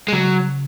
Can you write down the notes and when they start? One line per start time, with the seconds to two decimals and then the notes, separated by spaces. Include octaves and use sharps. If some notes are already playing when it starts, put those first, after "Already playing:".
0.08 G#3
0.13 C#3 F#3